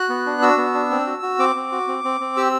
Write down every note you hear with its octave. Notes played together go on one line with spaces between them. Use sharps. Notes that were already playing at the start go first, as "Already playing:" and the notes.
Already playing: F#4 F#6
B3
D4
F#4 E6
B3
D4
C4
F#4
F#4
C4 D6
C4
F#4
C4
C4
C4
G4 E6